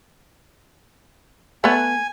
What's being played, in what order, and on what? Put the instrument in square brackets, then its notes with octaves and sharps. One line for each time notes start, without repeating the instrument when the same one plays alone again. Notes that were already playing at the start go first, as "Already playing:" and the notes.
[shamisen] A3 B3 [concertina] G#5